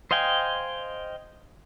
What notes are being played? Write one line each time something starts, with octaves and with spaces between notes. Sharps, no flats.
C5 D#5 F5 G5 G#5